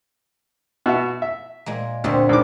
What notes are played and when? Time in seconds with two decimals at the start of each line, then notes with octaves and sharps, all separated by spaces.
0.86 B2 F#4 E5
1.22 E5
1.66 A#2 G#3 A#3
2.04 D2 A#2 D3 C4
2.29 C#2 D#3 D6